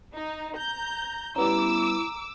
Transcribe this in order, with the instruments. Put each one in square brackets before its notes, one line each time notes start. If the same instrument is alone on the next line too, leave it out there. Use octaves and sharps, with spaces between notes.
[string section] D#4
A#5 G6
[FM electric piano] G3 B3 C#4 [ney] E4 [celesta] A#5 [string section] D6 E6